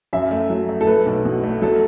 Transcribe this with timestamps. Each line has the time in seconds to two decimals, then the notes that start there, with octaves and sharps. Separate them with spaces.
0.13 F#2 E5
0.31 A3
0.50 F#3
0.69 A3
0.81 A4
0.87 A3 B4
1.06 B1
1.25 B2
1.44 A3
1.62 F#3 A4